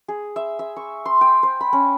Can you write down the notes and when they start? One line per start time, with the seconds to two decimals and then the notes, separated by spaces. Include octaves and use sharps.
0.08 G#4
0.36 E5
0.59 E5
0.76 C#6
1.06 C6
1.21 G5
1.43 C5
1.61 B5
1.73 C#4